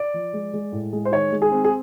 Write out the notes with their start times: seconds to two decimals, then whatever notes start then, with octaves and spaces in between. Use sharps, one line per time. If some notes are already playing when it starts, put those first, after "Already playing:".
Already playing: D5
0.14 F3
0.33 G#3
0.54 G#3
0.72 A2
0.93 G#3
1.05 C5
1.12 D#3 C#5
1.32 G#3
1.42 G#4
1.51 C4
1.65 G#4